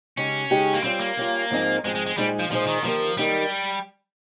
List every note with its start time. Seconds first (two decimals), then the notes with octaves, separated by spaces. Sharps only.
0.17 C#3 G#3 C#4 D#4 G4
0.50 C#3 G#3 D#4 G4
0.74 A#3
0.83 G3 C4 C#4 F4
1.00 A#3
1.17 G3 C#4 F4
1.51 G#2 F3 C4 D#4 G#4
1.84 G#2 F3 G#3 C4 D#4 G#4
1.95 G#3
2.06 G#3
2.17 A#2 G3 G#3 D#4 G#4 C5
2.39 F3
2.50 A#2 F3 G#3 D#4 G#4 C5
2.67 D#3
2.84 D#3 F3 A#3 D#4 G4 A#4
3.17 D#3 G3 A#3 D#4 G4 A#4